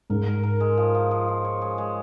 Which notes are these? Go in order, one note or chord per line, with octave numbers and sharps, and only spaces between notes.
G#2 A#4
A#4
A#4
G#3
F3
F3
F3
F3
C#5
G#3
G#3